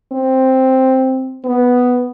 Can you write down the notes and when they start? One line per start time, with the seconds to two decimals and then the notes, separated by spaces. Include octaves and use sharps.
0.12 C4
1.45 B3